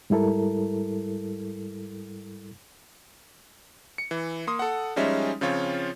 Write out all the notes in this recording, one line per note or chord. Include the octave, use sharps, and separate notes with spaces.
G#2 G3 E4 A4 A#4
C#7
E3
A#3 C6 D#6
A4 F#5
F3 G3 G#3 C#4 D#4 E5
C#3 F3 C4 F4 C#5